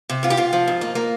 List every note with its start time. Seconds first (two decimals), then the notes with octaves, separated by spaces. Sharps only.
0.10 C3
0.23 G#2 F4
0.30 G4
0.37 G#2 F4
0.53 F3
0.68 G#2
0.81 A#3
0.95 A#3